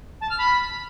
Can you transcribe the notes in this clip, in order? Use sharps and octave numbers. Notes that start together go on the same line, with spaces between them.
A5
F6
B5